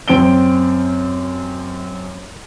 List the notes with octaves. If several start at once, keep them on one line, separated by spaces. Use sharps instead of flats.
F#2 C4 D7 G7